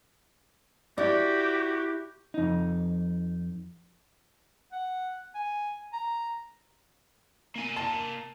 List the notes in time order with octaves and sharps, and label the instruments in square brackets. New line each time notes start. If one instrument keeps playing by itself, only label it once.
[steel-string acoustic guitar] E4 [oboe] F#4 [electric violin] G4 [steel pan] D5
[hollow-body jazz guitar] F2 D#4
[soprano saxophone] F#5
G#5
A#5
[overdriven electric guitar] A#3 G#5
[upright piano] A5